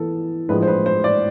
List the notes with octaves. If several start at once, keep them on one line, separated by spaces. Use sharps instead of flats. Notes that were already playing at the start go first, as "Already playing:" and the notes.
Already playing: E3 B3 A4
A2 F3 G#3 D4 B4
C5
B4
C5
D5